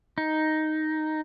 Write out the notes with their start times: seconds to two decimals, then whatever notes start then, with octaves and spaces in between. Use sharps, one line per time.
0.18 D#4